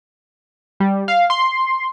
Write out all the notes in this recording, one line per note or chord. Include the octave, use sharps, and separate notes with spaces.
G3
F5
C6